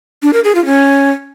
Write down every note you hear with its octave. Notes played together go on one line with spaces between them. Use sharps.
D4
A#4
G#4
F4
C#4